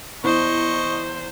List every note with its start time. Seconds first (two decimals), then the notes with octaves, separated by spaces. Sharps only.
0.24 E2 C5 D#5 C#6